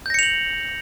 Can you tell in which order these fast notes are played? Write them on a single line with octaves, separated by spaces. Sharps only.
G6 A#6 C#7 F7 F#7